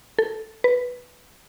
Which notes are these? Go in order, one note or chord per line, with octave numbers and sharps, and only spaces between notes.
A4
B4